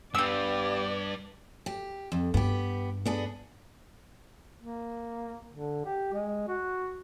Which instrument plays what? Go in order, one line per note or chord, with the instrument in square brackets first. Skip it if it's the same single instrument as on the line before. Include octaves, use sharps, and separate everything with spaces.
[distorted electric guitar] G2 [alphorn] B3 [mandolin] G4 E6 [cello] D5
[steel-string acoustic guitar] G4
F2
[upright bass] G2 [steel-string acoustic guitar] B3 G4
[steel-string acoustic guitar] B3 D4 G#4
[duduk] A#3
D3
G4
G#3
F#4